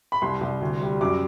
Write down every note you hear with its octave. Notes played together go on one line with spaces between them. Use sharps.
B5
C2 C6
C2
D2
G3
F#2 D6